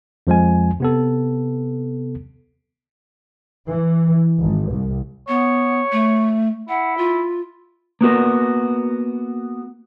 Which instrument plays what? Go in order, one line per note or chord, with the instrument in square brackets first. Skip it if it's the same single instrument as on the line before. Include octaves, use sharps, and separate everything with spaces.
[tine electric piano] F2 F3 G#3 G#5
C3 B3 A4
[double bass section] E3
G#1
C2
[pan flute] B3 [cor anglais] C#5
[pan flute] A3
[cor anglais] E4 [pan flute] F#5
[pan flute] F4
[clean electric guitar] A#3 B3 F#4 A#4